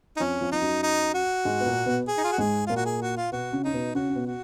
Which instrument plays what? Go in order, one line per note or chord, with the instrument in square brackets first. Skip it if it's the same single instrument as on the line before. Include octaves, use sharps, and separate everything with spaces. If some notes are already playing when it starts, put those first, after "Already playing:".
[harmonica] D#4
[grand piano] F2 F3 [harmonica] C#4
[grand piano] F2 F3
[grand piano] F3 [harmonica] D#4
[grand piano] F#2 F#3
[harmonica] D#4
F#4
[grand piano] G#2 G#3
B3
A#2 A#3
B2 B3
[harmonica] G#4
D#4
F4
F#4
[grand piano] G#2 G#3 [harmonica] G#4
[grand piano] A#2 A#3 [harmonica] F4
[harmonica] F#4
G#4
F#4
F4
[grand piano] B2 B3 [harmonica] F#4
[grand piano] C#3 C#4
[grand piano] C#4 [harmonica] D#4
[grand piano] B2 B3
[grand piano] C#3 C#4 [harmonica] F#4
[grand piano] C#4
B2 B3
[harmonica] F#4